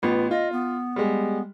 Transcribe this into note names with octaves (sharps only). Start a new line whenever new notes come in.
A1 B3 F4
F4 D#5
B3
G3 G#3